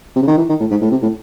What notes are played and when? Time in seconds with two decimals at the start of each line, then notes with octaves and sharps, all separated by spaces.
0.16 C3
0.22 C#3
0.28 D#3
0.38 E3
0.49 D#3
0.60 A2
0.71 G#2
0.82 A2
0.91 C3
1.02 A2